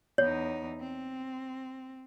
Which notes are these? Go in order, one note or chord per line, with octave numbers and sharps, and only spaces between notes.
E2 D#4 C#5
C4